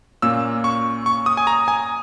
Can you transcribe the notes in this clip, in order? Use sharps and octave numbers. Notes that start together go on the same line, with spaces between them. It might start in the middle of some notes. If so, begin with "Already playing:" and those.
A#2 A#3 C#4 E6
C#6
C#6
D#6
G#5
A#5
G#5